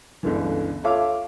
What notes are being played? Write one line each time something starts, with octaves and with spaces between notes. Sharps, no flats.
G1 C#2 D3 E3
F4 A4 C#5 E5 F5 D6